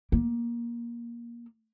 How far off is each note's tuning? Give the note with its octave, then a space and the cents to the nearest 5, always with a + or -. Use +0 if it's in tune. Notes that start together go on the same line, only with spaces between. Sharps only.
A#3 +15